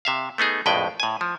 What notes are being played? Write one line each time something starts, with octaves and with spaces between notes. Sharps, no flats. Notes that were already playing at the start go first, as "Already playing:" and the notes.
C3 E5 F5
A3 B3 D#4 G#4
A#1 F2 A2 G#3 B4 G5
A2 G#5
F3